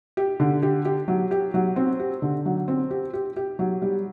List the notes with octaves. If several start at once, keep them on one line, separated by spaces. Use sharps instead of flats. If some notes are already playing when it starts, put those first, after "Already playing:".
G4
D3
G4
G4
F#3
G4
F#3
C4
G4
D3
F#3
C4
G4
G4
G4
F#3
G3